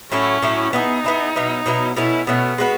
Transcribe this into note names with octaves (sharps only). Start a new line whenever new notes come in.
A2 F#3 A3 C#4 E4
A2 F#3 A3 E4
B3 D#4 E4 G#4
B3 E4 G#4
B2 F#3 B3 E4
B2 F#3 B3 E4
B2 A3 C#4 E4
B2 A3 B3 C#4
G#3 B3 F#4 B4